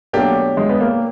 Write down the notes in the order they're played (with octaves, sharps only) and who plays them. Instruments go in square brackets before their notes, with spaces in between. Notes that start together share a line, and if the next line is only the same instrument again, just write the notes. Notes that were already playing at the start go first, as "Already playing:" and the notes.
[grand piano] B2 F#3 A3 D4 G4 [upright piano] A#3
[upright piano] G#3
B3
A#3